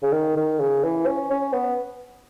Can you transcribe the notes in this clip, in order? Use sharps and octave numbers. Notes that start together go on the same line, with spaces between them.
C#3
D#3
D#3
C#3
E3
C#4
C#4
B3